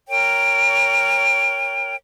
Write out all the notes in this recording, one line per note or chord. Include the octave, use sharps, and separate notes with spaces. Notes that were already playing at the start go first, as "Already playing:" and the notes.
A#4 C#5 G5